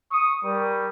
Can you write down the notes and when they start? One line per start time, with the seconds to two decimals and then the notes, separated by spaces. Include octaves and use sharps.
0.12 C#6 D#6
0.45 G3 A#4